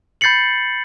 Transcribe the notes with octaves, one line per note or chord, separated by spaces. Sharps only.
B5 G6 A6 C7 C#7 F#7